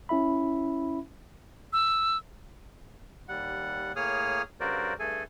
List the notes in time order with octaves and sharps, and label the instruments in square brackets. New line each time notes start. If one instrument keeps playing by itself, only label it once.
[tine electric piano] C#4 E4 E5 B5
[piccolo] E6
[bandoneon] D#2 G3 F#5
A2 A#3 G#4 C#5 D#6 F6
G2 C#3 F#4 A#4 C5 D5
G2 A3 G#4 A4 G#5